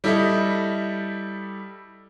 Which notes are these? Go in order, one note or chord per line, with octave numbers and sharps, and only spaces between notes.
G3 E4 A4 D#5 E5